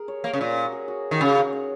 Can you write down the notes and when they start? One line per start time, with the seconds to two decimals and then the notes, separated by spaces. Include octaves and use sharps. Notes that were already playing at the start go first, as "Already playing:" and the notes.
Already playing: G#4 A#4
0.08 C#5
0.24 A#3 C#5
0.33 C#3
0.41 A#2
0.50 C#5
0.56 A#4
0.65 F#4
0.72 G#4
0.88 F#4
1.11 D#3 F#4
1.20 C#3 G#4
1.37 A#4
1.53 C#5